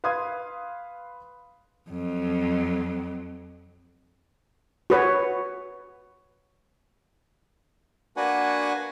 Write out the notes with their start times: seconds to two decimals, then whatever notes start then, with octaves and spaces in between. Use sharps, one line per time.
0.04 B4 F5 C6 D#6 G#6
1.90 F2 F#3
4.90 F#4 B4 C#5
8.17 A#3 D4 F#4 B4 F#5 G#5